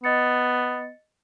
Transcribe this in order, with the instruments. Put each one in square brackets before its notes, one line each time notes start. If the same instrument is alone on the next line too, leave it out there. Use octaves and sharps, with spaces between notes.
[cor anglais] B3 [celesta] D#5 A6 C#7